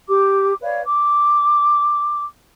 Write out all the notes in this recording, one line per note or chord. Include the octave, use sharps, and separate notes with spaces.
G4 D6
B4 C#5 D5 F5
D6